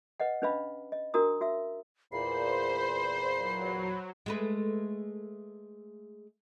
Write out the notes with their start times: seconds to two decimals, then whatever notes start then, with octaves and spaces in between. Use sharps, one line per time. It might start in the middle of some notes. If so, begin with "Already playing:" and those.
0.20 B4 D#5 F#5
0.42 C#4 D4 B4 D#5 F5 B5
0.92 D#5
1.14 D4 F#4 A#4 A#5 D#6
1.41 F#4 E5 E6
2.12 E2 A#2 C5 B5 C7
3.37 F#3
4.26 G#3 A3 B4